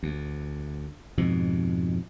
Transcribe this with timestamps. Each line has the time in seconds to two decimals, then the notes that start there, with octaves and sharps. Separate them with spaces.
0.03 D2
1.18 F2 G#2 B2